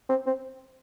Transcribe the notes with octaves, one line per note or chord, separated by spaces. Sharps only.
C4
C4